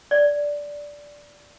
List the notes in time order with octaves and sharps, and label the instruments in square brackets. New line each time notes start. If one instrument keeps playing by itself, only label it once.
[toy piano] D5